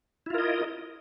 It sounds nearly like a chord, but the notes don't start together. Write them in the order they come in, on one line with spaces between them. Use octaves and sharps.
E4 F4 A#4 D#5